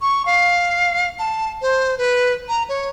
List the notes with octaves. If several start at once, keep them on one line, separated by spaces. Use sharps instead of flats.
C#6
F5
A5
C5
B4
A#5
C#5